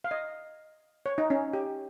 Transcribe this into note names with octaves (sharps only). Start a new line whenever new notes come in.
F5
D#5
C#5
D#4
C#4
G4